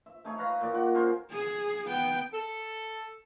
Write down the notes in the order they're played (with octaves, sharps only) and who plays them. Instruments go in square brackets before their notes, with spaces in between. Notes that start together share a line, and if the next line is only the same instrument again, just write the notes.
[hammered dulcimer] E5
A3 D#4 G#4 C#5
B4 F5 A#5
A#2 D#3 D5
F#4
C#4 G#4 A#4 C5
[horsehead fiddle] G#4
B3 G5
[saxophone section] A4